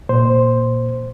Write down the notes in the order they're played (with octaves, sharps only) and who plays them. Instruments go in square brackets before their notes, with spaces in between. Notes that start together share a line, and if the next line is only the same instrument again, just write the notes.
[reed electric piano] A#2 C5